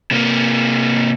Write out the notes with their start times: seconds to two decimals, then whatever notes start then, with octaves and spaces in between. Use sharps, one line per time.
0.11 C3 A#3